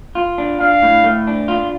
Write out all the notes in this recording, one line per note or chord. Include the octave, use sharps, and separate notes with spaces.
F4
D4
D4 F5
A2
A3
D4
F4